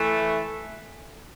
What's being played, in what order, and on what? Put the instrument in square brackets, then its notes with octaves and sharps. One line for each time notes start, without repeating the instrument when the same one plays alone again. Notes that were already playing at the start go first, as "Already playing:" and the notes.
Already playing: [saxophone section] E3 A3